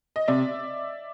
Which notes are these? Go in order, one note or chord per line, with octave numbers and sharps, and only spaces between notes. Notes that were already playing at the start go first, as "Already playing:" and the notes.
D#5
C3 D5 E5